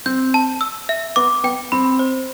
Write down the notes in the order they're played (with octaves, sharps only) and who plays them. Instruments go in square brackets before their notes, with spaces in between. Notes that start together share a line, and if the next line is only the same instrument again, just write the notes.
[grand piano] C4 [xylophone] G6
[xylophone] A5
E6
E5
[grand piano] B3 [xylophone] D6
[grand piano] B3 [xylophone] G5
[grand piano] C4 [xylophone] B5
[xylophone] C5